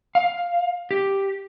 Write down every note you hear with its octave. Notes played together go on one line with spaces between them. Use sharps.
F5
G4